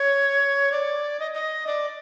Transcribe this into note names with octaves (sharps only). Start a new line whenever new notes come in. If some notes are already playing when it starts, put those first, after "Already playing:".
Already playing: C#5
D5
D#5
D#5
D5